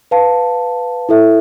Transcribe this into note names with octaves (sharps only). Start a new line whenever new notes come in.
B4 F5 A5
E4 A4 E5